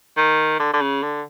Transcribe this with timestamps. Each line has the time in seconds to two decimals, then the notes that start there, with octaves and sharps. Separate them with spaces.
0.17 D#3
0.59 D3
0.73 D3
0.81 C#3
1.03 D3